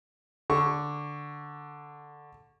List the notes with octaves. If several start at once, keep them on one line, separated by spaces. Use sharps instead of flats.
D3 C#6